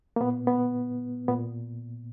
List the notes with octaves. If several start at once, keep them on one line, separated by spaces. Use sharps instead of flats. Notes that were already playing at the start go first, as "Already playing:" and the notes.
A#3
A#2 B3
B3
A#2 B3